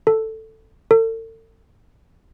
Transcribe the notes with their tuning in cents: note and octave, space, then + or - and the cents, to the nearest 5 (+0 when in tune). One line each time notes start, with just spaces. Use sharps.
A4 +5
A4 +40